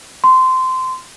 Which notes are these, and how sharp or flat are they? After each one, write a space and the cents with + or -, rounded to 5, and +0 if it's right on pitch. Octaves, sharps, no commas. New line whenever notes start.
C6 -15